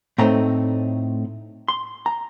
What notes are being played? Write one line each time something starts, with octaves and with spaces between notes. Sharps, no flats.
A2 A3 C4 D#4 A#5
C6
A#5